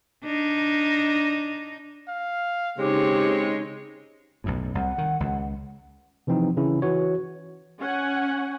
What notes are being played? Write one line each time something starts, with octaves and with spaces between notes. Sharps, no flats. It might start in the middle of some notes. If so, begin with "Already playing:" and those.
D4 D#4
F5
C#3 G#3 C4 D#4 G4 C#5
B1 F#2 A2
C2 F#5
D#3
C#2
C3 E3 F3 C4 D#4
C#3 E3 C#4 E4
E3 F#4 C#5
C#4 F#5 G#5